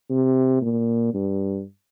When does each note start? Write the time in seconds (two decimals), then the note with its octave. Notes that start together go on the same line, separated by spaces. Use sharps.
0.10 C3
0.62 A#2
1.14 G2